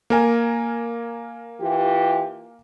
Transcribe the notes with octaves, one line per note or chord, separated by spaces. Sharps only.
A#3 A#4 G#5
E3 F4 G4